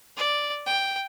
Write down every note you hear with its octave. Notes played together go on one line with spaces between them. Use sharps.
D5
G5